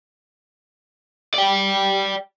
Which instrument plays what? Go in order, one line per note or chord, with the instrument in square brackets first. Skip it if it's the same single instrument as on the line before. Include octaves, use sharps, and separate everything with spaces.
[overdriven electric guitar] D5 G5